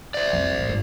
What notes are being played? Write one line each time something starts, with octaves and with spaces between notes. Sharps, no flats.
C5 D5
F2 G3
A1
G1